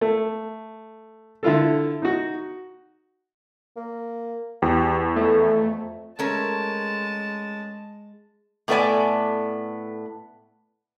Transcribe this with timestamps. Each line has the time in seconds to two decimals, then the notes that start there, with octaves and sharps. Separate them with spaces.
0.01 A3
1.43 D3 E4 F4 A4
2.02 D#4 F#4
3.77 A#3
4.62 E2 G4
5.16 F2 A3
6.19 G#3 A3 C#4 A#4 A5
8.68 A2 A3 B3 B4 D5 G#5